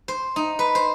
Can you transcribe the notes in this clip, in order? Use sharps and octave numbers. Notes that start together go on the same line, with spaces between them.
C5
D#4
B4
C5